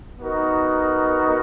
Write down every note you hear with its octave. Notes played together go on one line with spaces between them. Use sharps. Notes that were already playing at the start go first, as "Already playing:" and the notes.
B3 D#4 F#4 A#4